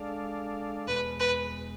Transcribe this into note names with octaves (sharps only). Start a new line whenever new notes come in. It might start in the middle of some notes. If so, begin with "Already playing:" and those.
Already playing: G#3 D4 A4 D5 F5
E2 B2 G#3 B4
B4